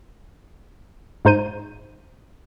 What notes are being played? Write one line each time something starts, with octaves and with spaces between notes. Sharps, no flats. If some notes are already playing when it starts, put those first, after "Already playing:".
G#2 G#3 D#4 C5 G6 D#7